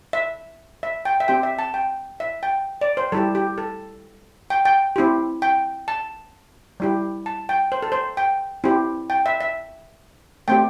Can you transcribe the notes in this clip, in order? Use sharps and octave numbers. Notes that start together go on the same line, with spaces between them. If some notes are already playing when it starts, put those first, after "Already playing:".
E5
E5
G5
E5
C4 G4 G5
E5
A5
G5
E5
G5
D5
C5
G3 E4 G4 A4
G4
A4
G5
G5
C4 E4 G4
G5
A5
G3 E4 G4
A5
G5
C5
A4
C5
G5
C4 E4 G4
G5
E5
E5
A3 C4 G4 G5